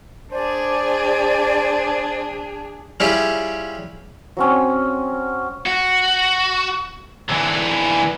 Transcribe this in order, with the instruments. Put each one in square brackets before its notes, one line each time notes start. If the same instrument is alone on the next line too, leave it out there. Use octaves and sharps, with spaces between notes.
[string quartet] D4 G#4 [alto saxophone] C5 [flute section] D5
[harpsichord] G3 C#4 E4 F4 G4 G#4
[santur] F#3 C4 C#4
[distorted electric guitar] F#4
D3 E3